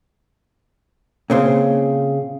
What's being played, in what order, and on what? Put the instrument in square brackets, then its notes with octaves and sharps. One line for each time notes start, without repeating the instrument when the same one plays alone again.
[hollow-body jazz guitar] A#2 C#3 C4